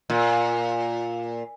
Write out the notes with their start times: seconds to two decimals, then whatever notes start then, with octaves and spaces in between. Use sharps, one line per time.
0.10 A#2